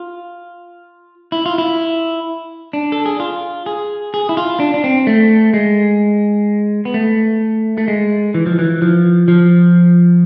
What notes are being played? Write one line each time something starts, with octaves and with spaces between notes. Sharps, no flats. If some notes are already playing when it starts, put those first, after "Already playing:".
Already playing: F4
E4
F4
E4
D4
A4
G#4
F4
G#4
G#4
E4
F4
D4
D4
C4
A3
G#3
B3
A3
A3
G#3
E3
F3
E3
F3
F3